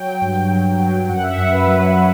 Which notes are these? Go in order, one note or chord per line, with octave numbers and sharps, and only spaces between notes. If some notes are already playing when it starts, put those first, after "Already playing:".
Already playing: F#3 G5
G2
F#3
F#3
F#2 F#5
E5
F#2 F#5
B4
F#3 B4
F#3